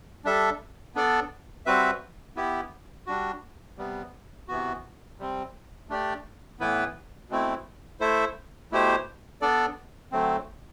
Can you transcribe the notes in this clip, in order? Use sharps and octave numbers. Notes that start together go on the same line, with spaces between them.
G3 D4 A4 E5
B3 D4 A4 D5
G3 C4 F#4 B4 E5
B3 E4 G4
G3 D4 F#4
C3 G3 B3
C3 E3 B3 F#4
C3 G3 C4
A3 D4 G4 D5
A2 E3 B3 E4 B4
B2 A3 C4 E4
A3 E4 A4 C5 E5
B2 A3 E4 G4 C5
B3 D4 A4 D5
D3 F#3 A3 C4